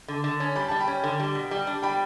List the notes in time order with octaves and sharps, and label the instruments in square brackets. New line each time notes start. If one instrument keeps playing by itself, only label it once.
[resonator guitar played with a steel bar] D3
D3
C#4
[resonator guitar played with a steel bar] G3 [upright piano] B5
[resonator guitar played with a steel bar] G3 [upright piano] A5
[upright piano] G5 B5
[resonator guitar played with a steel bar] C#4
D3
G3
B2
G3
D4
[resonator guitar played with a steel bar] G3 [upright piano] G5 B5